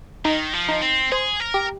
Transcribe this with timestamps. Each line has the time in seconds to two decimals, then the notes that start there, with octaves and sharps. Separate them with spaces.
0.25 D#3 D#4
0.53 F3
0.69 D#4
0.82 C4
1.12 G#4 C5
1.40 A#4
1.54 G4